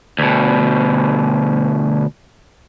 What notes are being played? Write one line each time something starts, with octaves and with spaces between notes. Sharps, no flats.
D2 B2